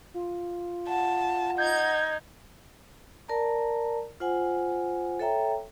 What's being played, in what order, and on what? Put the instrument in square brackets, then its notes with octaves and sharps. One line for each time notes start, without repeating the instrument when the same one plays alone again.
[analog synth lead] F4
[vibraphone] F#5 [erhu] A5
[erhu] D#4 [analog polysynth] G6 G#6
[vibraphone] A#4 D5 A5 A#5
F4 C5 F#5 G#5
A4 C#5 E5 G5 A#5